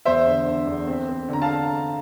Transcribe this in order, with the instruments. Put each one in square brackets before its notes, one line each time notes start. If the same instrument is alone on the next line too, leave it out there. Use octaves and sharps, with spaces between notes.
[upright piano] E2 C5 E5
D3
D3
E2
C4
C4
D3 A#5
F5 A5